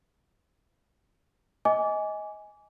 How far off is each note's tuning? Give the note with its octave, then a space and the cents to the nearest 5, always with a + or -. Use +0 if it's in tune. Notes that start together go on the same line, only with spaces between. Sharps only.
D#5 +20 G#5 +0 D6 -25